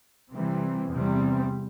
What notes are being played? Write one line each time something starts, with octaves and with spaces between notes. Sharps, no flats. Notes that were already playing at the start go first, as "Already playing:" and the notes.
C3 E3 G3 C4
E2 C3 G3 C4